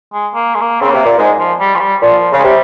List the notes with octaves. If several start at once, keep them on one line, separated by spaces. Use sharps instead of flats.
G#3
A#3
G#3
A#3
C#3 C4
C3 A#3
A#2
G#2 G#3
F3
G3
F3
G3
A#2 F3
C#3
G#3
C3 G3